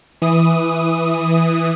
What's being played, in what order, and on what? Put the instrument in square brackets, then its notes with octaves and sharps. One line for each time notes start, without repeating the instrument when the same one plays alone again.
[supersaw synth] E3 D#6